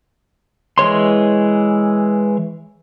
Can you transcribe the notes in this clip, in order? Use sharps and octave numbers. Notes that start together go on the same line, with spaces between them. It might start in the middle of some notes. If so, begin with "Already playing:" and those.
E3 G#3 C#5 C6